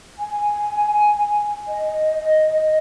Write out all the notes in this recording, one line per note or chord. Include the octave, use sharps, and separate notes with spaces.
G#5
D#5